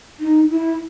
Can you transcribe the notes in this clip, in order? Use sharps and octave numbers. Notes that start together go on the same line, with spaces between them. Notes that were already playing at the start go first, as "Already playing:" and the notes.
D#4
E4